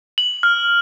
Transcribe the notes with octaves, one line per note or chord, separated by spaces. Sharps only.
F#7
F6